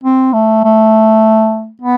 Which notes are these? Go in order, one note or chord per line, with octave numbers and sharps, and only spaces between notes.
C4
A3
A3
B3